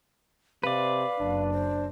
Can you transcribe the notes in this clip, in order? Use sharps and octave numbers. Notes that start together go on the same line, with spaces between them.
C3 B4 D5 F5
F#1 D4
C5